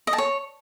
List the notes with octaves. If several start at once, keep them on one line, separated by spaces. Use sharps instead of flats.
D#5
A5
C#5